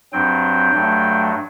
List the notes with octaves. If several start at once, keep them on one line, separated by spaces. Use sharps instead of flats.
G2 F#3 C4 G5
G2 F#3 A3